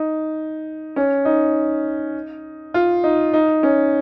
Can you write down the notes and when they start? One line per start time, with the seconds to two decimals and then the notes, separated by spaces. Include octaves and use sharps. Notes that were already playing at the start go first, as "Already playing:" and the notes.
Already playing: D#4
0.96 C#4
1.25 D#4
2.74 F4
3.04 D#4
3.33 D#4
3.63 C#4